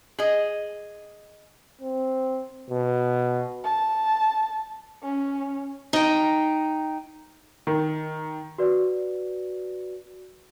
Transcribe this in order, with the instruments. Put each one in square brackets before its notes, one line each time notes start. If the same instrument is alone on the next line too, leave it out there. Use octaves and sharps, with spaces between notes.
[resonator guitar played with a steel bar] G#4 D#5
[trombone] C4
B2
[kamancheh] A5
C#4
[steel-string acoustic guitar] D#4 G5
[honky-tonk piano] D#3
[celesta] F#4 B4 D5